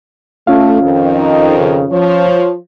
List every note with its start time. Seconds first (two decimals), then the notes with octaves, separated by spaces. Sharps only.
0.47 A3 C#4 F4 F5
0.82 F2 D#3
1.19 D#4
1.58 C#3
1.91 F3 C#5